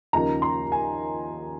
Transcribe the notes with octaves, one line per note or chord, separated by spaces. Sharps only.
D#2 C#3 F3 A#3 D#4 A#5
C6
G#5